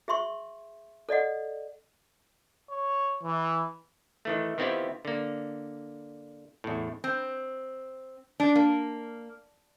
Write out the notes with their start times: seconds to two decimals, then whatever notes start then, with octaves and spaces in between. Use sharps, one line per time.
0.08 G#4 E5 C6 C#6
1.09 A4 D5 D#5 F#5
2.70 C#5
3.23 E3
4.25 D#3 E3 A3
4.58 D#3 B3 C4 E4 F4 G4
5.05 D3 A#3
6.64 E2 A2
7.04 C4
8.40 D4
8.56 A#3